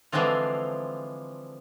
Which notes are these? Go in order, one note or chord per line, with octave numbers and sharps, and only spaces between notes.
D3 E3 F3 G#3 C4 F4